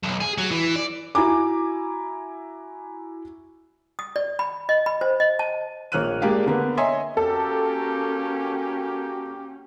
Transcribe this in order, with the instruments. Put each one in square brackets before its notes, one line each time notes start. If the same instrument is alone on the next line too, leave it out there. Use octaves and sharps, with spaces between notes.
[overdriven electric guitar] B1
G#4
F#3
E3
D5
[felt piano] E4 F#4 G#5 A#5 D6
[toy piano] D#6
D5
B5
D#5
B5
C5
D#5
A5
[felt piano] A#1 A#3 C#5 F6 F#6 D#7
G#3 A#3 D4 G4 D5 F5
D3 A#3 B3
C#5 D#5 E5 G#5 A#5 C6
[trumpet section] A#3 G4 [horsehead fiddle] C#4 [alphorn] F#4 [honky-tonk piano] A4